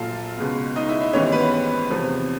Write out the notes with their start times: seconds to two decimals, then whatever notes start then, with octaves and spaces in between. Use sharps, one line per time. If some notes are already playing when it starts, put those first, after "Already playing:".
Already playing: A#1 A#2 F#3 F4 A4 F5 A5
0.37 C#2 B2 G#3 B3
0.76 D#4 D#5
0.89 E4 E5
1.01 E4 E5
1.13 G#1 G2 E3 G#3 B3 C#4 C#5
1.32 B3 B4
1.90 E2 C3 F3